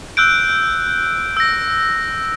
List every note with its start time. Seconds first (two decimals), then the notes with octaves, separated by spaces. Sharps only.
0.17 E6 F#6 G6 D7
1.37 E6 A#6